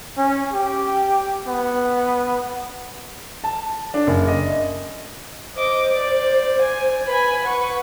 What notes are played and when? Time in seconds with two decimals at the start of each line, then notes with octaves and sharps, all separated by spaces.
0.17 C#4
0.52 G4
1.47 B3
3.44 A5
3.94 D4
4.07 F#1
4.27 D#5
5.56 C5 D#5 D6
5.94 D5
6.62 G#5
7.07 B4 G#5 B5
7.44 B4 F#5 C#6